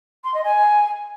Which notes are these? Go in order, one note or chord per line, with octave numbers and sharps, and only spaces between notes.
C6
D#5
G#5